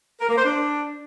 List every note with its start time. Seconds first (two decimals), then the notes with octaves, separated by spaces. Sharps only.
0.21 A#4
0.29 A#3
0.36 C5
0.44 D4